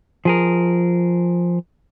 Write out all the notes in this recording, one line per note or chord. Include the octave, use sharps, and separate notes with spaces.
F3 G#4 A#4